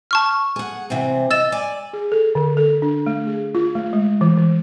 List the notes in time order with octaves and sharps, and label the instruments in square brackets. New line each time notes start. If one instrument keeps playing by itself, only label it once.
[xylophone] A5 C#6 F6
[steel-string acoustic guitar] G#4 F#5
C3 E3 C4
[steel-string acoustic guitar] D#5 [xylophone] E6 A6 E7
[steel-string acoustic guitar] D5 G#5
[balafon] G#4
A4
D3
A4
D4
A3
G#4
F4
A3
G#3
E3
E3